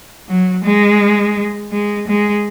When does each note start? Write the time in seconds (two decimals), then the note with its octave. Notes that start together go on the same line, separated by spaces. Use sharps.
0.29 F#3
0.65 G#3
1.72 G#3
2.08 G#3